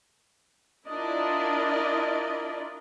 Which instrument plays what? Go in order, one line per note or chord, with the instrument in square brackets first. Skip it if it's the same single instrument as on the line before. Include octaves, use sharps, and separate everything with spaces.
[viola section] D4 E4 F4 A#4 D5 D#5